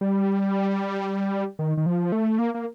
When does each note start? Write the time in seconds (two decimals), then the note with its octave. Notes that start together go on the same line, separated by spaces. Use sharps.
0.01 G3
1.59 D#3
1.77 D#3
1.86 F3
2.12 A3
2.39 A#3
2.54 A#3